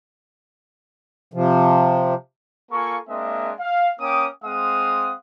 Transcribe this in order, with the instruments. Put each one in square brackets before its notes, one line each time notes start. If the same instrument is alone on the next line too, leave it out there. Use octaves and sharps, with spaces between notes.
[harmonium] C3 F3
[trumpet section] A#3 F4 A4 G#5 C#6
G#3 A#3 C4 D4 D#5 E5
F5
A#3 C#4 G5 D6 D#6
G#3 C4 F5 F#5 D#6